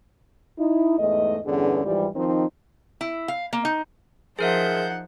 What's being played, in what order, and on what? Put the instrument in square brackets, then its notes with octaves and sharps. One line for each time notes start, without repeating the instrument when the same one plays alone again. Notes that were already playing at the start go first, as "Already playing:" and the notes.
[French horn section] D#4 E4
E2 G#2 A3 D#5
E2 G2 D3 B3 C#4 G#4
G#2 E3 F3 G3
D#3 F3 C4 D#4
[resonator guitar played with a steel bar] E4
F5
A#3
D#4
[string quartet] F3 C5 G6 [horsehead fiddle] D#4 F#5 [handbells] G#4 A#4 E5